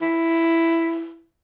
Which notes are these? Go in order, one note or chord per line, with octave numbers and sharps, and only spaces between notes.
E4